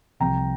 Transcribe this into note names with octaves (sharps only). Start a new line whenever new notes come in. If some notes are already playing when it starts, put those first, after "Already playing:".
C2 C3 F3 G5 A#5